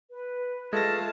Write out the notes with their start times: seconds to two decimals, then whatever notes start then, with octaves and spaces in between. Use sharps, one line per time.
0.10 B4
0.73 G#3 A3 F4 A5 A#6